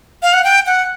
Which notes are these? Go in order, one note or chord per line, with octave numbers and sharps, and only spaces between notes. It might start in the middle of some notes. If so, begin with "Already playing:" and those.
F5
F#5
G5
F#5